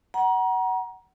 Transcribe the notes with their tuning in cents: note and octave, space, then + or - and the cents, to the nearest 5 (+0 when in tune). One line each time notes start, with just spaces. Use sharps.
F#5 +20 A#5 +30